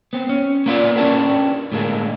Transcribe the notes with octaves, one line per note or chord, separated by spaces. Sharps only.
B3 C4
C#4
A#3 B3 F4 B4 D5
C#4 D4 E4 G4 A#4 B4
A2 D3 G#3 A#3